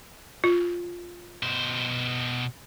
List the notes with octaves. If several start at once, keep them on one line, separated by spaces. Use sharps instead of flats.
F4
B2 C5